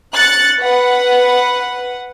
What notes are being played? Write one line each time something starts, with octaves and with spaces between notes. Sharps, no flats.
F#6 A6 C#7
B4 F#5